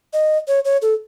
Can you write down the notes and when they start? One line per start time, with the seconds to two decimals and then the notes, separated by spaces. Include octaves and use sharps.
0.13 D#5
0.48 C#5
0.65 C#5
0.82 A4